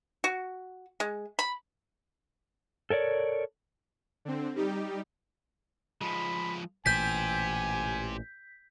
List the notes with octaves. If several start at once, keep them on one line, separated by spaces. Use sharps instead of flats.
F#4
G#3
B5
A4 A#4 C#5 D5
D3 C4
G3 D#4 G4
F3 G#3 B5
A1 A#2 E3 G4 C5 G#5 G6 B6